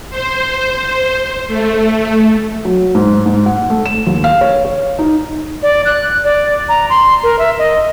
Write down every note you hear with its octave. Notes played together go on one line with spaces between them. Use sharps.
C5
A3
F#3
G#2
G#2
F#5
A3
E7
D#2
F5
C#5
C#5
D#4
D5
F#6
D5
A#5
C6
A#4
E5
D#5